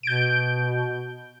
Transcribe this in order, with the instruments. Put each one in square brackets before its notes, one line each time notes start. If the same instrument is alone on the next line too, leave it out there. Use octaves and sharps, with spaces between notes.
[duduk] B2 [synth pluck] G6 D7